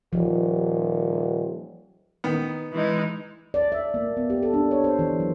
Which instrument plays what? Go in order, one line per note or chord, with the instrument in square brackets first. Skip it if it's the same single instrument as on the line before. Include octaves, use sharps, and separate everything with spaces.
[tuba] D#1 [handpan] F3
[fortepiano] D#3 B3
[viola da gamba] E3 G#3 D#4
[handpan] D5
E5
A#3
B3
G4
A4
D4
C#5
C5
E3
F#3